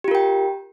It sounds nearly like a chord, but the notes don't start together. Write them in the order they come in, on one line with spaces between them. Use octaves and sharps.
G4 F4 A#4 G5